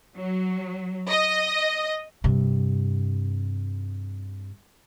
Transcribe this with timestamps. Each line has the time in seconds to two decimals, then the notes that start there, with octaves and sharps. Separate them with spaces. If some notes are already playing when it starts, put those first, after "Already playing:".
0.17 F#3
1.10 D#5
2.24 G2 C3